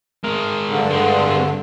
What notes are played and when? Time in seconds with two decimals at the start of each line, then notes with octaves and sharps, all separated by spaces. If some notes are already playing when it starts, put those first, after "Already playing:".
0.23 G#3 A#4
0.68 G2 D3
0.90 G#3 C4